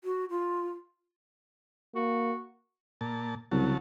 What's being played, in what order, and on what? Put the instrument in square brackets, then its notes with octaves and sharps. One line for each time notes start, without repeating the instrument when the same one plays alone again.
[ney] F#4
F4
[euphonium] A#3 [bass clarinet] F#4
[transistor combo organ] A#2 A5
[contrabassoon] C2 [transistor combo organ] C#3 F#3 A5